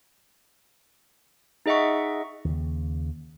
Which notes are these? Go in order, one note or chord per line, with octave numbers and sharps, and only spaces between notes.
D#4 G#4 D#5 E5 F#5 C#6
D#2 C#3